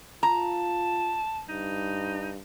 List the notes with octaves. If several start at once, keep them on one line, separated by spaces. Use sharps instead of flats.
F4 A5 A#5
G2 D#4